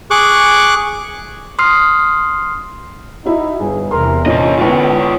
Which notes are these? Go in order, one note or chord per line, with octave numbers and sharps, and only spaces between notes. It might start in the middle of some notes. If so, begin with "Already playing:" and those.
G#4 C#6 D6 F#6
C6 D#6 F6 C7
D#4 E4 F#4
G1 G#4
E2 C3 E3 A#4 C6
A#1 A#2 C#4 F4 D#5
G#2 D3 B3 E4 F4 C#5 G5